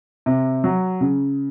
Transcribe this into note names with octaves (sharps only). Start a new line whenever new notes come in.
C3
F#3
C#3